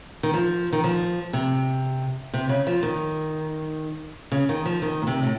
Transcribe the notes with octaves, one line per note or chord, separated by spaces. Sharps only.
D#3
F3
D#3
F3
C3
C3
C#3
F3
D#3
C#3
D#3
F3
D#3
A#2
C3
A2